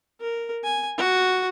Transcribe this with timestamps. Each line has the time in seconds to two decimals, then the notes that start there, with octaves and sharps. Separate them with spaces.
0.21 A#4
0.64 G#5
0.98 F#4